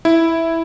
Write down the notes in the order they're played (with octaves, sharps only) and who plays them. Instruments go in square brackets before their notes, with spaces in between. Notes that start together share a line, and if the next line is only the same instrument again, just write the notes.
[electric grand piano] E4